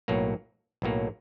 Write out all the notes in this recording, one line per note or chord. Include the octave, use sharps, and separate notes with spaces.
B1 A2 F#3 A#3
B1 A2 F#3 A#3